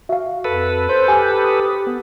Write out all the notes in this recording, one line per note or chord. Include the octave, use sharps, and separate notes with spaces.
F#4 E5 F5
F2 A4 B4
C5 G6
G4 G#5 D6 F6
D#6
B3